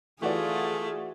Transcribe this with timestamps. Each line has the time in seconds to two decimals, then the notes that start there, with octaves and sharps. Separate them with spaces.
0.22 E3 A3 F4 F#4 G#4 D5